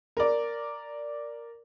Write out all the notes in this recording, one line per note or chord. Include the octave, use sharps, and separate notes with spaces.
A#4 D5